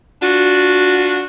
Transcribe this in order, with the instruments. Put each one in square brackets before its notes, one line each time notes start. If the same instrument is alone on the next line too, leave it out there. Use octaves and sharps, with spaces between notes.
[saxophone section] D4 F4 F#4